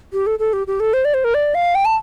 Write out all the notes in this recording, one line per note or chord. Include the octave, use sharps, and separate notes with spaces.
G4
A4
A4
G4
G4
A4
C5
D5
C5
A#4
D5
F5
G5
A5